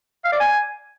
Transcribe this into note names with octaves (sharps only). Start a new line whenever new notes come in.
F5
D5
G#5